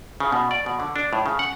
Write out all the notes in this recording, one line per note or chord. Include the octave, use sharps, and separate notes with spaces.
C#3
B2
D5
B2
D3
D4
A2
C#3
F#5